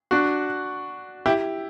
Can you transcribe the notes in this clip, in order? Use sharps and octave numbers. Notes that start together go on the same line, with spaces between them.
D4 F#4
E4 G4